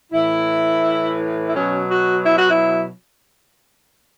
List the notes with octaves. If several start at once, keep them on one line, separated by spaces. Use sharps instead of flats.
A2 E3 E4
E4
B2 F#3 C#4
F#4
E4
F#4
E4